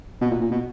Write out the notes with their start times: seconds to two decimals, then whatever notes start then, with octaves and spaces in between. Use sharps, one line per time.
0.21 B2
0.31 A#2
0.41 A#2
0.51 B2